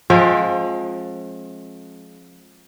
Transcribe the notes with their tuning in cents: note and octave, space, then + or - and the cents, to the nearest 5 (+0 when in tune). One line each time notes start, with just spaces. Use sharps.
F3 +25 G#3 +30 C#4 -45